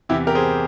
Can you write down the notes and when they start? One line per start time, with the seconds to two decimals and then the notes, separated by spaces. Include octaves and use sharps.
0.09 E2 C3 E3 E4 G4
0.27 G4 A#4
0.35 G#4 C5